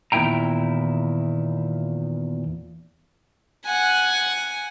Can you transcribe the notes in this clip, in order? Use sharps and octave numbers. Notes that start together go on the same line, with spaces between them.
E2 A#2 D#3 E4 G5 A#5
F#5 G#5